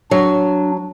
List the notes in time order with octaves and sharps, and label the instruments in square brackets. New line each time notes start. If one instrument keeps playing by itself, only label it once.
[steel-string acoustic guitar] F#3 [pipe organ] D4